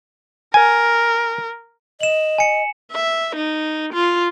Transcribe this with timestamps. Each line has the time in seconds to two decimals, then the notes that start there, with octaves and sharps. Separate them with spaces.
0.54 A#4 G#5
2.01 D#5 E7 F#7
2.38 G#5 C#7
2.92 E5
3.36 D#4
3.93 F4